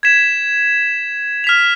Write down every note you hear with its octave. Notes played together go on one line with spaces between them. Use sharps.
G#6 B6 E7
F6 B6 F7